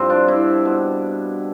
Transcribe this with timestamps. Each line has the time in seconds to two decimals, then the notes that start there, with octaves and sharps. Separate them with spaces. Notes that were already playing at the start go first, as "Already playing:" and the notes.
Already playing: G2 F3 C4 G4
0.09 D4 F4
0.28 C4 E4
0.65 B2